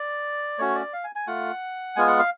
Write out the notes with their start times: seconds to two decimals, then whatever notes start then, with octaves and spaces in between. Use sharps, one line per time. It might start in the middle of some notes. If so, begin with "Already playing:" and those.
Already playing: D5
0.58 A3 C#4 F#4 C#5
0.75 D5
0.93 F5
1.04 G#5
1.15 G#5
1.27 A3 F4 F#5
1.96 G#3 B3 F4 G#5
2.08 F#5
2.19 F5